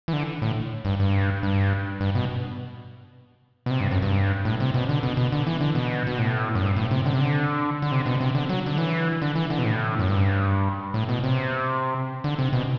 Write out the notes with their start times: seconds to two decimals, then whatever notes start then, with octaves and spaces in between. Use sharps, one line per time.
0.08 E3
0.13 D3
0.42 A2
0.85 G2
1.00 G2
1.43 G2
2.00 G2
2.15 B2
3.66 B2
3.70 C3
3.80 G2
3.91 F#2
4.02 G2
4.45 A2
4.60 C3
4.74 B2
4.89 D3
5.03 B2
5.17 B2
5.32 D3
5.47 E3
5.61 D3
5.75 B2
6.07 B2
6.18 A2
6.55 F#2
6.62 G2
6.76 A2
6.91 C3
7.06 D3
7.14 C3
7.21 D3
7.82 D3
7.92 C3
8.06 B2
8.21 C3
8.35 D3
8.49 F#3
8.66 D3
8.78 E3
9.22 D3
9.35 E3
9.50 D3
9.59 B2
9.65 A2
9.99 F#2
10.08 G2
10.94 A2
11.09 B2
11.24 C3
12.24 D3
12.39 C3
12.53 B2